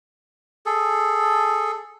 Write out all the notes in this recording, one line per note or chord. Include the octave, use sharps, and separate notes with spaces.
G#4 A4